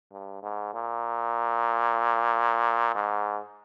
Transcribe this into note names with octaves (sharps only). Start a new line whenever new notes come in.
G2
G#2
A#2
G#2